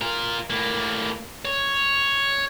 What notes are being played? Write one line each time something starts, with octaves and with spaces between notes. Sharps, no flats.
F4 A#4
A2 A#3
C#5